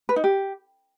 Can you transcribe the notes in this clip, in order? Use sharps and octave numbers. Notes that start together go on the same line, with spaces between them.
B4
D#4
G4